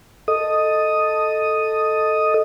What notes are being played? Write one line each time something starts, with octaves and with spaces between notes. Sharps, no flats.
A4 D#5 D#6